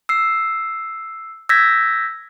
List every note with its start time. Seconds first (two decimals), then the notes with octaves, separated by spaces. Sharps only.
0.09 E6 C7
1.49 E6 G6 G#6 A#6 B6